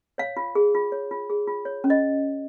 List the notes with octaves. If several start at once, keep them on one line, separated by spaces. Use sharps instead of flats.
C#5 F5
F4
G#4
F4
C#5
F4
G#4
F4
C#5
C#4
D#5